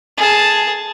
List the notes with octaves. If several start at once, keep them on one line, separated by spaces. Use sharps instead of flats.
G#4 A5